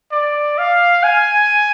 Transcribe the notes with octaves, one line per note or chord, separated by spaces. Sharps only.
D5
F5
G#5